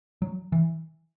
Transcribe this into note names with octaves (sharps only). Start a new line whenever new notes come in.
F#3
E3